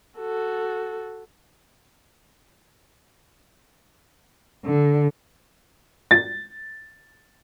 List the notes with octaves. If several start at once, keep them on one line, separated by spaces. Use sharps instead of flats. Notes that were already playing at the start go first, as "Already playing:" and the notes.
F#4 A4
D3
A6